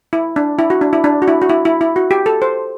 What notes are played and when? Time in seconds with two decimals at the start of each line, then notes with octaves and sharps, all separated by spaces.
0.13 E4
0.36 D4
0.59 E4
0.70 F#4
0.81 D4
0.93 E4
1.04 D4
1.22 F#4
1.28 E4
1.42 F#4
1.49 E4
1.65 E4
1.81 E4
1.96 F#4
2.11 G4
2.26 A4
2.42 C5